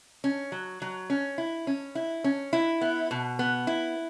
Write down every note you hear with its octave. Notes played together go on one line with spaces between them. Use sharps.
C#4
F#3
F#3
C#4
E4
C#4
E4
C#4
E4
B3
B2
B3
E4